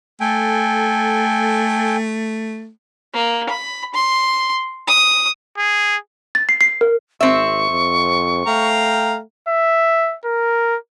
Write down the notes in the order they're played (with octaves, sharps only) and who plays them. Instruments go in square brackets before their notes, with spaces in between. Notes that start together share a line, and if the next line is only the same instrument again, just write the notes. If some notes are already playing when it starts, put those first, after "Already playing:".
[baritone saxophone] A3 [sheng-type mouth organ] A4 G5 G#5
[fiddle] A#3
B5
C6
D#6
[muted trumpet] G#4
[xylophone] A6
C7
C7
A#4
[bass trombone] G#1 [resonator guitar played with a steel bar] C4 E5 [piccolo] C#6
[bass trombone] F2
[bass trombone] A3 [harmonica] F5 G5 A#5
[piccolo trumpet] E5
A#4